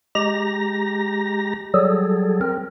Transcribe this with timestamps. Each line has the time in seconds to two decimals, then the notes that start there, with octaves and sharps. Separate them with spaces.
0.15 G#3 G4 A#5 A#6
1.74 F#3 G3 G#4 A4
2.41 C4 A#4